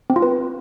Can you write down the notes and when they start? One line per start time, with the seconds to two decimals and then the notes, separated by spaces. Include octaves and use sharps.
0.10 C4
0.16 F4
0.22 B4